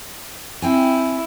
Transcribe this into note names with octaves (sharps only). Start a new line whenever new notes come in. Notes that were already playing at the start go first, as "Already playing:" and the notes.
C4 E4 G5 G#5